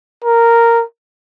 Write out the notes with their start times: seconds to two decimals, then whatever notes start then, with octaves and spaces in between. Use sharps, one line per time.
0.24 A#4